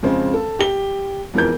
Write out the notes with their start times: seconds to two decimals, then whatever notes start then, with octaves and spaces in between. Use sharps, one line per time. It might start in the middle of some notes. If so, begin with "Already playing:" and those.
0.03 F2 C#3 G#3 C4
0.34 A4
0.59 G4 G7
1.34 E1 F2 E3 A#4 G6